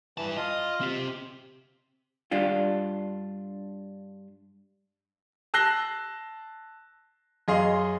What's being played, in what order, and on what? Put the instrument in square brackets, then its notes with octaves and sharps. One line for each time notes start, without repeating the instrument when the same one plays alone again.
[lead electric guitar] G2 A5 [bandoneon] E3
[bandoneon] F4 [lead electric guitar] D#5
[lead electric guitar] C4 G4
[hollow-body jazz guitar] G2 D4 F4
[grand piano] A5 E6 F#6 A#6 C7 G7
F#2 G#4 D#5 F5 C6